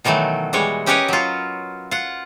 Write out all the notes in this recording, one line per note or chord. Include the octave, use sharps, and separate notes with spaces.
B2 D#3 E3 F#3 A3
E3 G3 G#3 C#5
C#4 G4 A#4 B4 C#5 D#5
F#3 F4
F4 F#5